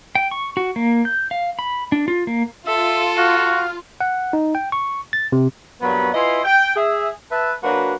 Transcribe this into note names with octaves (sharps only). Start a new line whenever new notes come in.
G5
C#6
F#4
A#3
G6
F5
B5
D4
F4
A#3
F4 A4 E5
F#4 F5
F#5
D#4
G5
C#6
A6
C3
G2 A#2 F#3 B3 F#4 B5
E4 F4 B4 D#5 G#5 C6
G5
G#4 E5
B4 E5 A5
F#3 A#3 D4 F#4 B4